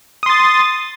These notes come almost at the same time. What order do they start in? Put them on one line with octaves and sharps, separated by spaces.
D#6 C6 A6